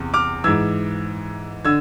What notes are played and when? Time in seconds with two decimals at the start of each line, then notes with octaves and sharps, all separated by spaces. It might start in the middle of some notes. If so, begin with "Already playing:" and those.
Already playing: E2 C3
0.14 D6 F6
0.44 G#2 E3 E6 G#6
1.65 D3 E6 G#6